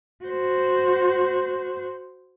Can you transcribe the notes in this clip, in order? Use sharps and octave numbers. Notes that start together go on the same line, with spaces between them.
F#4 C5